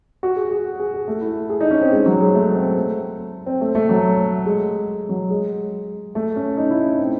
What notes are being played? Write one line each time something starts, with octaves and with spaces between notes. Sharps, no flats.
F#4
G#4
G#4
G#4
G#4
A3
E4
G#4
D#4
C#4
C4
G#3
F#3
G#3
A3
C4
A3
C4
A3
A3
F#3
G#3
F#3
G#3
A3
C#4
D#4
E4
C#4
C4